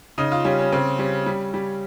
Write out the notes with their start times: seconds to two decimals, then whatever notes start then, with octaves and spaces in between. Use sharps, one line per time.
0.18 C#3 D#4
0.32 F4
0.45 G3 C#4
0.59 C#4
0.72 C#3 C4
0.99 G3 C#4
1.26 G3
1.54 G3